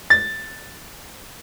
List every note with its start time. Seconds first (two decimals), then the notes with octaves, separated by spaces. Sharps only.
0.10 A6